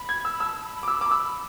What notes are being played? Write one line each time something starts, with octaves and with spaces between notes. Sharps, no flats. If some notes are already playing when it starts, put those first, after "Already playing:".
Already playing: B5
G#6
E6
A5 E6
A5
B5
B5
D6
B5 E6
A5 D6
B5 E6